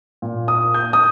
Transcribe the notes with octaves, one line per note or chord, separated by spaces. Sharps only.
A#2
D#6
G6
D#6